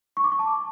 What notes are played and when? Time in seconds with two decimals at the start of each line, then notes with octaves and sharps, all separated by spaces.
0.17 C#6
0.24 D6
0.32 C#6
0.39 A5